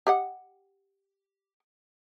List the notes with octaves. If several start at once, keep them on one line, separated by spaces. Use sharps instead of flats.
G4 D#5 F#5